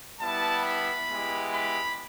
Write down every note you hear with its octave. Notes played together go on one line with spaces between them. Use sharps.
G3 B3 E4 A5
B5
G#3 B3 E4 G4
B5